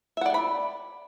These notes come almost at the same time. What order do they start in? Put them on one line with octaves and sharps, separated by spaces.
E5 F#5 D5 G5 B5